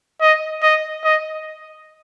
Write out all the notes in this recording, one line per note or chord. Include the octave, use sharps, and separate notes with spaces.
D#5
D#5
D#5